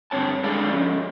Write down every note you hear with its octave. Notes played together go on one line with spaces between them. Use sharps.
G2 D3 C4 C#5 A5
G#3 D4 G#4 A4 D5 F5
F3 C#4